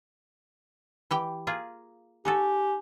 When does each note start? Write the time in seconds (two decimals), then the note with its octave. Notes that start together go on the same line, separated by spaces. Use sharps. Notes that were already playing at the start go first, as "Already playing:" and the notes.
1.11 E3 G4 G5
1.47 A#3 F4 G#4
2.25 D#4 F#4 G4 A4 G#5